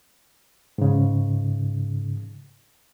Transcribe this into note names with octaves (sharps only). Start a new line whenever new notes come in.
G#2 C#3